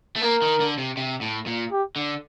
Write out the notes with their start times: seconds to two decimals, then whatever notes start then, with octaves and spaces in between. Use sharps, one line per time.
0.16 A3
0.22 A#3 A#4
0.42 D#3
0.60 D3
0.78 C3
0.97 C3
1.21 A2
1.46 A#2
1.72 G4
1.96 D3